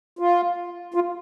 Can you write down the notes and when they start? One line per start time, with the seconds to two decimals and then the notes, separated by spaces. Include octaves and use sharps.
0.19 F4
0.94 F4